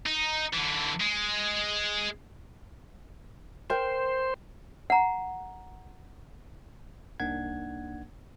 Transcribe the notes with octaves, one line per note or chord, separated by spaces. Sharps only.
D#4
D3 E3
G#3
A#4 C5 G5
F#5 A#5
C2 A#3 D4 D#4 F#5 G#6